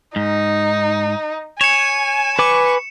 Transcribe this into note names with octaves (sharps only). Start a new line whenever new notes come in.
G#2 D#4
C#5 G#5 C#7 E7
B4 G#5 C#6 D6